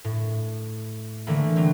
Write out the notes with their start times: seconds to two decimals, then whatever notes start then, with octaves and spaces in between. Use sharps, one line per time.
0.04 A2
1.27 D3 E3 A3 A#3
1.56 F#3 G3 C4